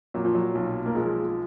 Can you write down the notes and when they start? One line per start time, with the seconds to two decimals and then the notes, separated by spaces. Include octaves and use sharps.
0.14 A#2 F#3
0.25 F3
0.35 F#3
0.55 B1
0.86 A#3
0.95 F3 G#3